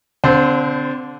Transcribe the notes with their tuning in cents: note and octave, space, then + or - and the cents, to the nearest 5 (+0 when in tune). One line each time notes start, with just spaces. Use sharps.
D3 -20 C4 -35 C5 +0